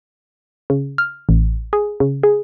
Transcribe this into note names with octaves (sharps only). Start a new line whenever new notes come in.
C#3
F6
A1
G#4
C#3
G#4